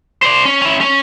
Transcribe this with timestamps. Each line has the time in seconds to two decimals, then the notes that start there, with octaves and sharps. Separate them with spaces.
0.22 C5 D5
0.45 C#4
0.62 C#4 E4
0.81 C#4